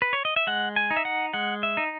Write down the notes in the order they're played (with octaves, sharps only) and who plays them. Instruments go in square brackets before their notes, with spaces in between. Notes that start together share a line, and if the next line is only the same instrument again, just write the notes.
[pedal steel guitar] B4
C#5
D#5
E5
G#3 F#5
G#5
D#4
E5
F#5
G#3 F#5
E5
D#4